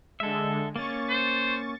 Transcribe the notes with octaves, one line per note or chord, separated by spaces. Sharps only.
D3 G#3 A4 E5
A#3 C#4 C#6 A6
C5